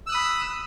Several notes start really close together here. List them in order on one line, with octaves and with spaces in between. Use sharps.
E6 F#6 D#6 B5